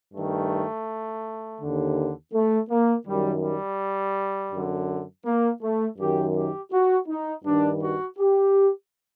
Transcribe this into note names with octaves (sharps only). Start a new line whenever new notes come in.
G2 D#3 A3
D#2 D3
A3
A#3
F#2 D#3 G3
G3
F#2 D3
A#3
A3
F#2 D#3 G4
G4
F#4
D#4
G2 D#3 D4
F#4
G4